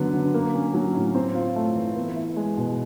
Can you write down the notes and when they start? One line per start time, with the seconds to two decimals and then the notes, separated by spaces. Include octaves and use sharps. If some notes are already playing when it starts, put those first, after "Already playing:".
Already playing: D3 F#3 B3
0.13 D3
0.34 A#3
0.54 C#4
0.74 F#3
0.94 A2
1.14 C4
1.35 F4
1.56 A3
1.76 E3
1.96 B3
2.16 E4
2.36 G#3
2.57 B2